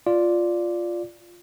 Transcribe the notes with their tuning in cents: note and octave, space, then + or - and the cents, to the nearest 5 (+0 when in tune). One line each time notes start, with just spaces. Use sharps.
F4 +0 D5 +0